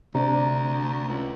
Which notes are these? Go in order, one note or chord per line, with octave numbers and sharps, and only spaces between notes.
D2 C3 D4 A#5
C#2